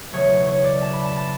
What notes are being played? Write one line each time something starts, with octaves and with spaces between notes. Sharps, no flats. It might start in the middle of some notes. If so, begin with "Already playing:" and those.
E1 E2 C#3 F#3 A3 C#5
C#5
D5
A5
B5
A5
A5